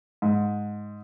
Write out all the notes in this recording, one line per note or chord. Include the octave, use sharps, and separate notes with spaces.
G#2